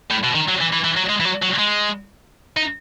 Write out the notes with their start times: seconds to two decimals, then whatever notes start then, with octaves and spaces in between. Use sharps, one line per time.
0.10 A2
0.23 B2
0.35 D#3
0.48 F#3
0.60 E3
0.73 E3
0.84 E3
0.97 F#3
1.10 G#3
1.20 E3
1.25 F#3
1.42 F#3
1.58 G#3
2.57 D#4